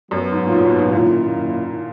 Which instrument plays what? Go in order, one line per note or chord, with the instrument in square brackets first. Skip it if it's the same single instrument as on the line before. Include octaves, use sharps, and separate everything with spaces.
[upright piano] F#2 [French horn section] F#3 B3 F#4 C#5
[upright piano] G#2
A#2
G#2
B2
G#2
[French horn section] F#2 D#3 A#3 E4 [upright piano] A#2